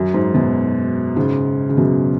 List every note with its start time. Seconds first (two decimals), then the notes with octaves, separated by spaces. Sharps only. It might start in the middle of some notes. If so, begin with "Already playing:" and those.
Already playing: F#2
0.14 G#2
0.34 F#2 B2
1.16 G#2 C#3
1.69 C#3
1.77 F#2 B2